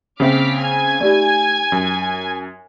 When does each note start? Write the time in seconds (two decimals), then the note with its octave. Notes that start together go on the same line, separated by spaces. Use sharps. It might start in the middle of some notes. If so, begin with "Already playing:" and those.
0.20 C#3 A#3 C4 E5 G5 D6 F6 B6
0.59 G#5 G#6
1.01 A3 D#4 G4 D5
1.72 F#2